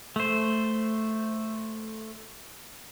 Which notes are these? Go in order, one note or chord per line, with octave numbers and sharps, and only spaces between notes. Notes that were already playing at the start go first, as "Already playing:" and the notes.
A3 C5